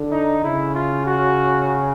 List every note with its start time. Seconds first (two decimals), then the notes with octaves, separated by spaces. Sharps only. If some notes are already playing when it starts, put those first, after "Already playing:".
Already playing: D3
0.12 D#4
0.44 C#3 E4
0.75 F4
1.06 F#4